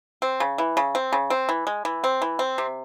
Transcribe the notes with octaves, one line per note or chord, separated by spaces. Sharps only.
C4
C#3
E3
C#3
C4
C#3
C4
E3
G#3
E3
C4
E3
C4
C3